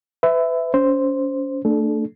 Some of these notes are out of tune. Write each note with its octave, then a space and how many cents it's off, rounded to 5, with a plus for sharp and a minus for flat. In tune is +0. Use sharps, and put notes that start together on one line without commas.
B4 +35 E5 +0
C#4 +25 C5 +0
A3 +35 D4 +15 A4 -30